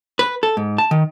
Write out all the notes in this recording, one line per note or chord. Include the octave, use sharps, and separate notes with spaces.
B4
A4
G#2
A5
D#3